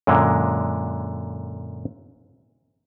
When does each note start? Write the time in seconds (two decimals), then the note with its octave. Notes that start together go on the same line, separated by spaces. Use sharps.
0.07 F#2 A#2 D3 G#3